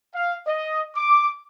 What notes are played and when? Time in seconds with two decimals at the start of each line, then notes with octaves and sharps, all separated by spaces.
0.14 F5
0.46 D#5
0.95 D6